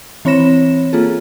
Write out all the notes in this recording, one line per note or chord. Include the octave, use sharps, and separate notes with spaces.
E3 C4 C#5 B5 A#6 E7
A#3 F4 G#4 A4